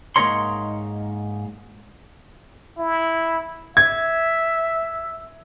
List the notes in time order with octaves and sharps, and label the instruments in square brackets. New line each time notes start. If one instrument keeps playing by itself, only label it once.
[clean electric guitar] G#2 A#3 D#4 A#4 C#5 C6
[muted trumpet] E4
[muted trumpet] E5 [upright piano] G#6